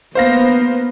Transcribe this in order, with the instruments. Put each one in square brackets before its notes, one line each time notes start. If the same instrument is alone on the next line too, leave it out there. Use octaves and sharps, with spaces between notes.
[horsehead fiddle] A#3 B3 [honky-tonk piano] C5 F5 A#6